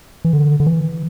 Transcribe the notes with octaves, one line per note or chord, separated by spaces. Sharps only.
E3
D3
D3
E3